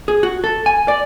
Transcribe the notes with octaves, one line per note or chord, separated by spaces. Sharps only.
G#4
F#4
A4
G#5
D5